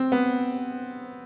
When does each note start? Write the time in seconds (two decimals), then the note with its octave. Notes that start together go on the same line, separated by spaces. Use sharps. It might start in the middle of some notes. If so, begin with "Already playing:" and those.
Already playing: C4
0.12 B3